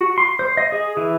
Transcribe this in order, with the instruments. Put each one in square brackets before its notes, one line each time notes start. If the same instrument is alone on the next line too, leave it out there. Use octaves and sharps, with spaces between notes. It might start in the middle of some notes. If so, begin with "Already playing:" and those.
[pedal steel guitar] F#4
C6
C5
D#5
G#4
E3